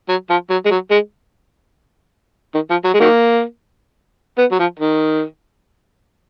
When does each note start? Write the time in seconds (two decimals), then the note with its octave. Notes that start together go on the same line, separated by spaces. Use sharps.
0.09 F#3
0.30 F3
0.50 F#3
0.66 G#3
0.71 F#3
0.91 G#3
2.54 D#3
2.70 F3
2.84 F#3
2.94 G#3
3.00 D#3 F#3 A#3
4.38 B3
4.52 F#3
4.59 F3
4.79 D#3